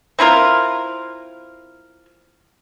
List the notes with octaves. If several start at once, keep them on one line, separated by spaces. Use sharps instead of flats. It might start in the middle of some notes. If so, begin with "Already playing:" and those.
C4 E4 F4 A#4